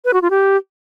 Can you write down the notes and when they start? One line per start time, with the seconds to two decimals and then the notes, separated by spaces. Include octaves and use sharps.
0.05 B4
0.13 F#4
0.22 F4
0.30 G4